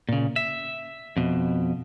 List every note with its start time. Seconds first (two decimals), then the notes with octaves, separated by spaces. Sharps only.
0.09 A#2 C#3
0.36 E5
1.17 F2 B2